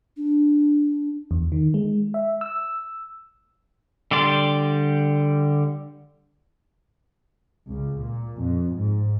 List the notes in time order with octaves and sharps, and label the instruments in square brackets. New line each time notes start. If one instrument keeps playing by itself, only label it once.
[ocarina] D4
[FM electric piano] E2
D#3
G#3
E5
E6
[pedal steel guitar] D3 G3 G4 D5 C6
[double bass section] C#2
A#2
F2
G#2